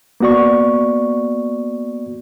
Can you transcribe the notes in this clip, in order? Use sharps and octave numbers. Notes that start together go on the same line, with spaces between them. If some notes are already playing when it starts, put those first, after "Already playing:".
A#3 B3 F#4 D5 C#6